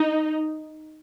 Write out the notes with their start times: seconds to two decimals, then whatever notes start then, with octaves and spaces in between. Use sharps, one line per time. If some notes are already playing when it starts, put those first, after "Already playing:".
Already playing: D#4